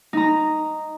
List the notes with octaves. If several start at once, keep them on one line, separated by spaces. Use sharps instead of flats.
D#4 A#5